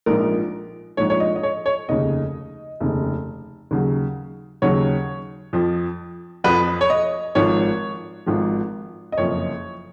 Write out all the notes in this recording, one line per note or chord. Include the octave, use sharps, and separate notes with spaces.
A#1 G#2 F3 A#4
A#1 G#2 F3 C#5
C#5
D#5
D#5
C#5
C#5
F1 D#2 C#3 D#5
F1 D#2 C#3
D#2 C#3 F#3
D#2 C#3 F#3 C#5
F2 F3
F2 F3 B4
C#5
D#5
G#1 G#2 F3 C#5
G#1 G#2 F3
D#5
F#1 F2 F3 C#5